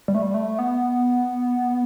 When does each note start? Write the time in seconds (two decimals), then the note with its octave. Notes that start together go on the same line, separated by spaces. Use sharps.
0.08 G3
0.15 A3
0.22 G3
0.34 A3
0.59 B3